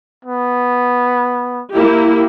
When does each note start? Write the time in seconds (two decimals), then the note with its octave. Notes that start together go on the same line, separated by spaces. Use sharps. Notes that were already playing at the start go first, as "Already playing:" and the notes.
0.25 B3
1.74 A#3 E4 G4